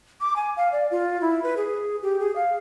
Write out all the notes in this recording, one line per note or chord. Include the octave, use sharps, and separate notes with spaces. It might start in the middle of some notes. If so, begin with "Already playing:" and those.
D6
G#5
F5
D5
F4
E4
B4
G#4
G4
G#4
F5